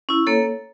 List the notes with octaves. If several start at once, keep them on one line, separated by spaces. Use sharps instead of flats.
C#4 E4
A#3 A4 C#5